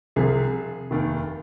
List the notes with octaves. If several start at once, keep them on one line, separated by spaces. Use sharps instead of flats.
C2 C3 F3 G#4
F1 D#2 D#3